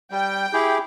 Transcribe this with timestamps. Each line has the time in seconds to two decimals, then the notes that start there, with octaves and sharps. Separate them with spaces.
0.11 G3 G5
0.53 E4 G4 G#4